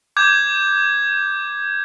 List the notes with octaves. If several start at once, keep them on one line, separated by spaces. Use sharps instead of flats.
D6 G6 G#6